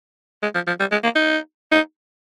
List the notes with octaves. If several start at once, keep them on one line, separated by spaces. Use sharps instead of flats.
G#3
F3
F3
G3
G#3
A#3
D#4
D#4